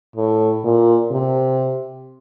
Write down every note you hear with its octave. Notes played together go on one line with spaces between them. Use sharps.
A2
A#2
C3